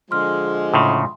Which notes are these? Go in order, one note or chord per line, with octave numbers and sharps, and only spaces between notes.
D3 F3 G#3 C6 F6
A2 C#3 C6